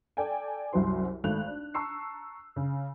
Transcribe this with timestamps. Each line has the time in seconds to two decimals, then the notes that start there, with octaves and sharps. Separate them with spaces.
0.17 A4 D5 G5 G#5
0.73 C2 F#2 F#3 C5 C6
1.24 G#1 A3 F#6 F7
1.47 D4
1.74 A5 A#5 C#6 E6 C7
2.56 C#3